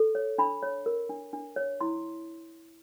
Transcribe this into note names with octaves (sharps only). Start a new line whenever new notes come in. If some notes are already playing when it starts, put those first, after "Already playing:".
Already playing: A4
C#5
D4 B5
C#5
A#4
D4
D4
C#5
E4 C6